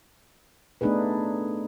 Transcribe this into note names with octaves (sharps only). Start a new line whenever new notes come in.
A3 B3 D4 D#4 G#4 B4